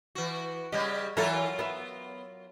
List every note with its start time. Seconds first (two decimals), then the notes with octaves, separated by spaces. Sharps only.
0.15 E3 F#4
0.72 C#3 G3 G4 D#5
1.17 E3 F#3 E4 F4 A4 A#4
1.59 B3 E5